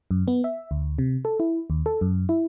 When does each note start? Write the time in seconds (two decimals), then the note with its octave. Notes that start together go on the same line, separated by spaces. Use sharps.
0.11 F#2
0.28 B3
0.44 E5
0.71 D2
0.98 C3
1.25 A4
1.40 E4
1.70 D#2
1.86 A4
2.01 F#2
2.29 E4